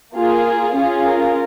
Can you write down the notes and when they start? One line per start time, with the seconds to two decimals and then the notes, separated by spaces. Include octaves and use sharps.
0.14 A#3 F4 G#4
0.75 C#4 F4 G#4
1.05 A#4